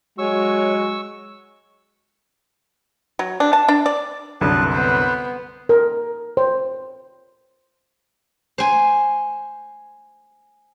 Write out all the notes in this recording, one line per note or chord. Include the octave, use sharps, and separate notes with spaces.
F#3 G#3 F#4 C#5 C#6 E6
F#3
D4
A5
D4
D5
C2 F#2 D3 B3 B4 A5
B3 B4 C5
A#4
C5
C5 G#5